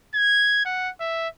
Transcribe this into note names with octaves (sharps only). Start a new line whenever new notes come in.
G#6
F#5
E5